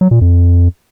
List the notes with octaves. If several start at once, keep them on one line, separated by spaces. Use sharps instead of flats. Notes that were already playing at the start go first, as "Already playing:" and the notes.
F#3
A#2
F2